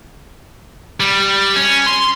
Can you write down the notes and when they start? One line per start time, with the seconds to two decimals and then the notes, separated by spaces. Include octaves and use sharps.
1.00 G3
1.56 C#4
1.86 C6